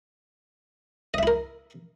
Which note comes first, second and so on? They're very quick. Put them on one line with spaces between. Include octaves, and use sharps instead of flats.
D#5 E5 E4 A#4